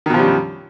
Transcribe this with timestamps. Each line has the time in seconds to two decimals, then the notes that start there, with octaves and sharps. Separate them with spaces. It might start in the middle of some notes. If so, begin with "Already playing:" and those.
0.06 D#3
0.10 B2
0.14 F3
0.18 G3
0.22 F#2